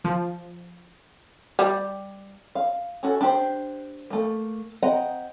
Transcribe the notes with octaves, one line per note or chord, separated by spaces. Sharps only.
F3
G3
F5
C#4 F#4 A4
D4 G4 C5
A3 A#3
C4 D#5 F#5 A#5